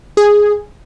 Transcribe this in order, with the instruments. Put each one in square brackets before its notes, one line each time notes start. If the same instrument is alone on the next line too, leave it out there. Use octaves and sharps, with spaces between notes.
[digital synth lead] G#4